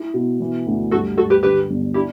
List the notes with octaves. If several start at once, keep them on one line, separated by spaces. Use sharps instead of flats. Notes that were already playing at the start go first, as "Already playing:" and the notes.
Already playing: E4
B2
E3
D2
G2 F#4 A4
G2 F#4 A4
G4 B4
D3 G4 B4
G1
D4 E4 G4